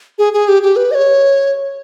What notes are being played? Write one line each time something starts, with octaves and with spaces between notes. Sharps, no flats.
G#4
G#4
G4
G4
B4
D#5
C#5